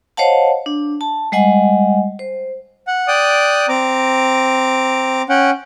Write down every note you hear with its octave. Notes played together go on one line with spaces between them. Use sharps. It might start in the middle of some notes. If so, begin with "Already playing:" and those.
C5 C#5 D#5 F5 F#5 A5
D4
A5
G3 G#3 D#5 F#5 G#5
C5
F#5
D5 G5 D#6 F#6
C4 A#5 D6
C#4 F#5 G5